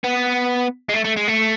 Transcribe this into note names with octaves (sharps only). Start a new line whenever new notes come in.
B3
G#3
A3
A3
G#3
A3